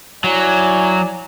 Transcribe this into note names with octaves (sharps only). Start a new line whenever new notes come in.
F#3 E4 D5 G#5